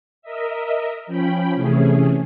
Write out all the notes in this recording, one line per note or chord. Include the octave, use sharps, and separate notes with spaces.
A#4 D#5 E5
F3 C#4 G5 B5
C3 E3 A3 C#4 G#4